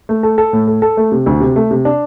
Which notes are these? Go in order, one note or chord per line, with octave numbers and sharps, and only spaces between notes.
A3
A4
A4
A2
A4
A4
A3
C3
D2
C3
A3
C3
D4